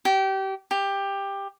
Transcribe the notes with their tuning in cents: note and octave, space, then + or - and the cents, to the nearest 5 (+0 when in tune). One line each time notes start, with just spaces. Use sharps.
G4 -25
G4 +15